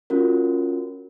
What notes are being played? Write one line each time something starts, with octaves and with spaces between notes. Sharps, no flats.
C#4 F4 F#4 A#4